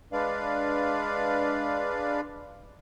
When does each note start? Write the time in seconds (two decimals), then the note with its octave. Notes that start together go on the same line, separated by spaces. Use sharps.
0.12 G#3 D4 B4 D5 F5